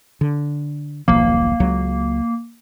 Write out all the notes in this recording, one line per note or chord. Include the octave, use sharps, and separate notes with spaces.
D3
D#1 B1 F3 A#3
C#2 F#3